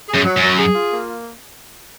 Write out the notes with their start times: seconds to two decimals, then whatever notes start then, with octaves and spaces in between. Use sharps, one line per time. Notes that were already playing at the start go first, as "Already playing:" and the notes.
0.09 G#4
0.14 F#2
0.25 F#3
0.37 F#2
0.42 F#3
0.59 G#4
0.75 F4
0.91 A#3